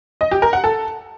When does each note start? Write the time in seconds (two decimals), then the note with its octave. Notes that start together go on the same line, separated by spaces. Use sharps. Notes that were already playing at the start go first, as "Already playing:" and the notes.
0.21 D#5
0.31 G4
0.42 A#4
0.53 F#5
0.64 A4